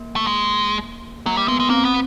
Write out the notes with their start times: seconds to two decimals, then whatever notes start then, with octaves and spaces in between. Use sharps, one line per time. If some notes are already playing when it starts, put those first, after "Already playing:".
Already playing: A#3
0.16 A3
0.27 G#3
1.26 F#3 A#3
1.37 G3
1.48 G#3 B3
1.60 G#3
1.70 A#3 C4
1.85 B3